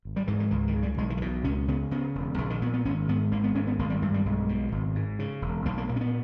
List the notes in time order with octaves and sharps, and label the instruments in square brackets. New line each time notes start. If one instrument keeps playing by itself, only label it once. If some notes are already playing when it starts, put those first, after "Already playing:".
[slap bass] G#1
G3
G#2 E3
E3
C#2 E3
D#3
C#3
G3
B1 G#3
E3
D#3
B2 E3
C#2 C#4
C#3 B3
C#3 B3
E1
A#1 E3
D#3
A#2 B3
B3
G#1 C#4
G#2 B3
G#1 A#3
B3
G#2 C#4
B3
G#1 A#3
G3
G2 E3
G3
B1 G#3
B2
G#1
G#2
C#3
E1
B1 A#3
A#3
A#2 A#3
C#4
B3